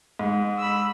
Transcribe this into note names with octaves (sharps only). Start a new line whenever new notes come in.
G#2
B5 E6